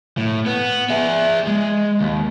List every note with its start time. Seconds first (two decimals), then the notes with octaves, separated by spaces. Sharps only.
0.17 A2
0.46 B3
0.90 G#4 E5
1.47 G#3
2.01 D#2